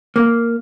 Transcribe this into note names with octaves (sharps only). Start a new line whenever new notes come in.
A#3